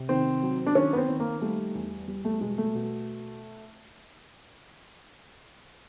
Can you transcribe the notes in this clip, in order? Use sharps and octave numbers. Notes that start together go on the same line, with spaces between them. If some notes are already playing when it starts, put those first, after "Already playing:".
Already playing: C3
D#3 C4
F#3
D4
D#3 C#4
B3
C4
D#3
A#3
G3 A3
E2
G3
A3
B2 G#3
A3
B2